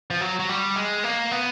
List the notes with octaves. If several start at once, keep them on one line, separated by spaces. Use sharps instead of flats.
F3
F#3
F#3
G3
G#3
A#3
B3